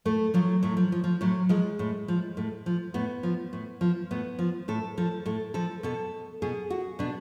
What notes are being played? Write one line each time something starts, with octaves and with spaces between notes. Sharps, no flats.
A2 A3
F3 F#3
A2 F#3
F3
F3
F3
A2 F#3
F3 G#3
A2
F3
A2
F3
A2 B3
F3
A2
F3
A2 B3
F3
A2 A4
F3 A4
A2 A4
F3 A4
B2 A4
B2 G#4
F#4
B2 D4